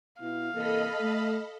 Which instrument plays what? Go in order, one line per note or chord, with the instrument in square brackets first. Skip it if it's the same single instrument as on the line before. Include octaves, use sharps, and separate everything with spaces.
[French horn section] B2 B3 E4 [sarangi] F5
[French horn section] C3 E3 A#3 [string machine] A4 D#5 B5
[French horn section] A3